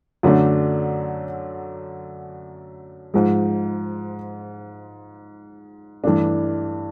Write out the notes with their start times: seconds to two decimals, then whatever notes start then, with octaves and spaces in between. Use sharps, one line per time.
0.23 F#2 D3 F#3 A3 D4
3.14 G#2 F3 G#3
6.04 G2 E3 A3 D4